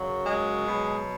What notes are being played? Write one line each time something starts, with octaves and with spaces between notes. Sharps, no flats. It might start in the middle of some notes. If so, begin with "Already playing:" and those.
Already playing: F#2 C#3 F#3
G#3
B2 F#3